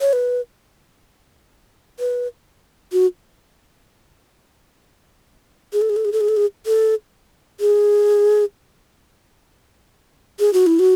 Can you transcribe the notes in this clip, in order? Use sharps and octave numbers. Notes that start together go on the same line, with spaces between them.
C#5
B4
B4
F#4
G#4
A4
G#4
A4
G#4
A4
G#4
A4
G#4
A4
G#4
G#4
F#4
E4
F#4